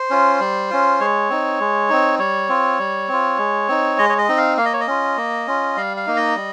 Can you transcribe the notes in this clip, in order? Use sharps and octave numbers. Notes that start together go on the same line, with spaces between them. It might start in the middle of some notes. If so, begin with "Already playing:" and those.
Already playing: C5
C#4 F4
G3
C#4 F4
G#3 C#5
C4 D#4
G#3
C4 D#4
G3 C#5
C4 F4
G3
C4 F4
G#3
C4 D#4
G#3 D#5
C#5
D#5
C4 D#4
F5
A#3 F5
D#5
C#5
D#5
C#4 F4
A#3
C#4 F4
G3 F5
F5
A#3 D#4
D#5
G3